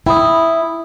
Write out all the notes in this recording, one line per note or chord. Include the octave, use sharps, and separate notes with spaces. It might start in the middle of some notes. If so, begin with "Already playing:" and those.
E4 G5 B5 D#6